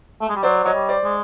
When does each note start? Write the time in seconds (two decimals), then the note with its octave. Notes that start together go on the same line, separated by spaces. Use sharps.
0.21 A3
0.29 G#3
0.36 G3
0.43 F#3 C5 D5
0.64 F#3 C#5 D#5
0.74 G3
0.89 C5 D5
1.04 G#3